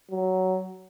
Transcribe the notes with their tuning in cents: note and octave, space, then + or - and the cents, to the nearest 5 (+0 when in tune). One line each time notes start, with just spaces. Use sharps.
F#3 +10